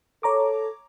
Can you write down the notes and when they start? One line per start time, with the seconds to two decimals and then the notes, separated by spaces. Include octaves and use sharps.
0.23 A4 C#5 A#5 D6